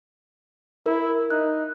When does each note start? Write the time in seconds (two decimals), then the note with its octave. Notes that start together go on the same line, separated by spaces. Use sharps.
0.86 E4 A#4
1.30 D#4 F#6